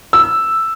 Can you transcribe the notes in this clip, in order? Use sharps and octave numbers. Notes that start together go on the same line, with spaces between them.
E6